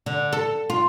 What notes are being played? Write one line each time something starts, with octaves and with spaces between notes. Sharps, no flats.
D3
A4
F4